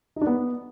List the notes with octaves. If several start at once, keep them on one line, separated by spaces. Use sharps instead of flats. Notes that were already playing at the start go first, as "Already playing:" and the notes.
D#4
D4
B3